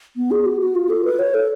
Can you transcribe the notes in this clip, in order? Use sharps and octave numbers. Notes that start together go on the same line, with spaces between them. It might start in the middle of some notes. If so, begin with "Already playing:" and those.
B3
G#4
F#4
F#4
F4
A4
B4
C#5
A4